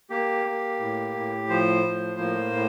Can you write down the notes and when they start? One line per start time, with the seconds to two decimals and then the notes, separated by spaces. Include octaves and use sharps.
0.10 A#3 G4
0.45 A#3
0.80 A2
1.15 A2
1.49 F3 C5
1.84 A2
2.18 A#3
2.53 A2